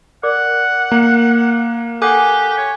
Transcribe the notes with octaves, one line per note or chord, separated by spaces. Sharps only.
A#4 D5 F#5 D6
A#3 A#5
G4 A4 F#5 G#5 D6 F#6
C#5